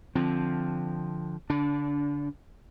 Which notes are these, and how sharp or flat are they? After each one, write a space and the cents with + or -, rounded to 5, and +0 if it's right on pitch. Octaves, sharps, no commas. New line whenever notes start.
D3 +0 F3 +0 C4 +0
D3 -35 D4 -20